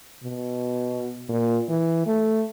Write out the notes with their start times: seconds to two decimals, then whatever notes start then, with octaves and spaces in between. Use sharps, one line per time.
0.24 B2
1.29 A#2
1.69 E3
2.07 A3